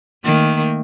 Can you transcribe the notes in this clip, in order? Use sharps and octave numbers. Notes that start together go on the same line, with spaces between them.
D#3 A3 A#3